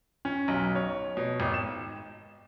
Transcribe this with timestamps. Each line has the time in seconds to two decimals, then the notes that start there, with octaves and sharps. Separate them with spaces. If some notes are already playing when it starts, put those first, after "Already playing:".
0.25 C#4
0.48 B1
0.75 C#5
1.17 B2
1.40 G#1
1.54 E7